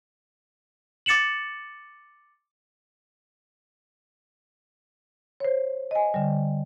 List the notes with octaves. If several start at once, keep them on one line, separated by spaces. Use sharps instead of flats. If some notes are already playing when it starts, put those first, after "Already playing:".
D6 A6 C#7 E7 F#7
C5 C#5
D#5 G#5
D3 G3